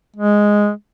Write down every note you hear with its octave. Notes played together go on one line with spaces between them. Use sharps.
G#3